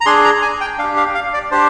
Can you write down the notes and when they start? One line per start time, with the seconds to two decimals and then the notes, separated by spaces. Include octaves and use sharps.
0.01 A#5
0.06 D4 G#4 C6
0.24 A#5
0.42 G#5
0.61 G5
0.78 D4 F5
0.84 G4
0.96 F5
1.15 F5
1.34 D5
1.51 D4 G4 C5